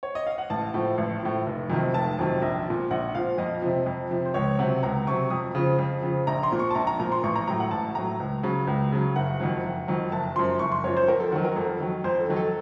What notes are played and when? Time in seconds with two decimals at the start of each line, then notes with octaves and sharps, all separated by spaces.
0.03 C#5
0.15 D#5
0.27 F5
0.38 F#5
0.50 A1 A5
0.74 A2 F3
0.98 A1
1.22 A2 F3
1.46 F1
1.70 F2 C3 D#3 F#3
1.94 F1 A5
2.19 F2 C3 D#3 F#3
2.42 A#1
2.66 A#2 F3
2.91 A#1 F#5
3.14 A#2 F3 F5
3.38 F2 D#5
3.62 C3 F3
3.86 F2
4.11 C3 F3
4.26 C5
4.34 C#2 C#5
4.59 C3 F#3 F#5
4.83 C#2 A#5
5.07 C3 F#3 C#6
5.30 F2 D#6
5.55 C#3 F3
5.79 F2
6.03 C#3 F3
6.27 A#1 A#5
6.43 C6
6.51 A#2 F3
6.59 C#6
6.70 A5
6.75 A#1 A#5
6.87 A#5
6.99 A#2 F3 A#5
7.12 C6
7.23 A1 C#6
7.36 A#5
7.48 A2 F#3 A#5
7.60 F#5
7.71 A1 A5
7.95 A2 F#3 A#5
8.20 C#2
8.43 C#3 F#3
8.67 C#2
8.92 C#3 F#3
9.16 F#1 F#5
9.40 F2 D#3 F#3
9.64 F#1
9.88 F2 D#3 F#3
10.12 F#1 A5
10.36 F#2 F3 C6
10.59 F#1 C#6
10.72 C6
10.84 F#2 F3 C#5
10.97 C5
11.08 F2 A#4
11.20 A4
11.32 D#3 F#3 F#4
11.45 A#4
11.56 F2 A4
11.80 D#3 F#3
12.04 F2 C5
12.20 A4
12.29 D#3 F#3
12.36 A4